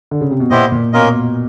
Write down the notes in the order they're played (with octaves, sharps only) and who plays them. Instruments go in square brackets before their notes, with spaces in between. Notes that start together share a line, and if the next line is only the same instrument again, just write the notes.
[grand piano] D3
C#3
C3
B2
[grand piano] A#2 [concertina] B3 E4 G4 C5 D#5
[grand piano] A#2
[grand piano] B2 [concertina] A#3 C#4 F4 A#4 D#5